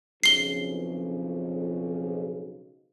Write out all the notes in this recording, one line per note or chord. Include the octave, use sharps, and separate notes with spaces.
B1 F2 C#3 C7 G7